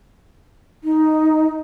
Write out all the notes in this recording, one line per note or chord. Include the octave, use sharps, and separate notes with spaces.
D#4